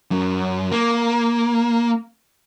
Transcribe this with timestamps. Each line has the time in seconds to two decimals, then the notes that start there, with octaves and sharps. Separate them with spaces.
0.11 F#2
0.72 A#3